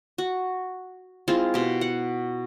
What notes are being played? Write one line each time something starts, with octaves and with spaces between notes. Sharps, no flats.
F#4
G#3 C4 E4 F4
B2 G4
F#5